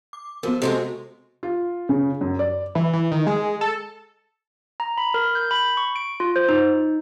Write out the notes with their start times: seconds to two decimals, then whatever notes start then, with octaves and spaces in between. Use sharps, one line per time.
0.13 D6
0.43 F3 B3 F#4 A#4
0.62 C3 G#3 A3 F#4 A4 C5 D#5
1.43 F4
1.89 C#3
2.21 F#2
2.39 D5
2.75 E3
2.93 E3
3.11 D#3
3.27 G#3
3.61 A4
4.80 A#5
4.98 B5
5.14 A#4
5.35 G6
5.51 B5
5.77 C#6
5.96 D7
6.20 F4
6.36 C5
6.49 D#4